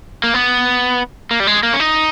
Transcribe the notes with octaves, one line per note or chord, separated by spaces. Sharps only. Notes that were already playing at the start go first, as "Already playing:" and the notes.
A#3
B3
A#3
G3
G#3
A#3
C#4
D#4